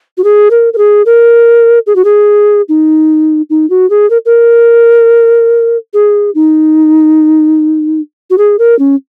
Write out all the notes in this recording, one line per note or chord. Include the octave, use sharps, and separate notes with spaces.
F#4
G#4
A#4
A#4
G#4
A#4
G#4
F#4
G#4
D#4
D#4
F#4
G#4
A#4
A#4
G#4
D#4
F#4
G#4
A#4
C#4